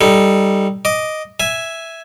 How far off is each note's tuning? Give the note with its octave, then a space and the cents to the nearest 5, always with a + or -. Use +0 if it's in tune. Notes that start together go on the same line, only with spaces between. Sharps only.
G3 +0 D#4 +0 A4 +5
D#5 +0 D6 +0
E5 +0 G#5 +0